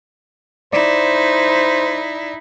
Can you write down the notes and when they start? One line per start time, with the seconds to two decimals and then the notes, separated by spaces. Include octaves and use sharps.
0.73 D#4 E4 C5 D5